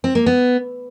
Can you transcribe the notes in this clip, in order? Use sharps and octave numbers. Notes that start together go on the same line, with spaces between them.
C4
A#3
B3